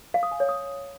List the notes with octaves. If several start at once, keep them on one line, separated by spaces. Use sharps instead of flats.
F5
D#6
G#5
C#5
D#6